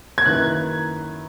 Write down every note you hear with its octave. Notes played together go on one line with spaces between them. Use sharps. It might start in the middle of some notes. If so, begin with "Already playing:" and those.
G#6
F#2 D#3 A#3 E4 B4 F#6